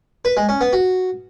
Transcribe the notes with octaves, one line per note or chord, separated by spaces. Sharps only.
B4
G#3
C#4
B3
F#4